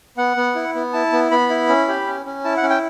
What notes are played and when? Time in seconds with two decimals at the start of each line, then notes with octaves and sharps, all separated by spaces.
0.17 B3 F#5
0.37 B3
0.55 E4
0.75 B3
0.93 E4 A5
1.12 B3
1.31 B3 B5
1.50 E4
1.69 C#4
1.88 G4
2.07 C#4
2.26 C#4
2.44 E4 A5
2.57 F#5
2.63 C#4
2.70 G5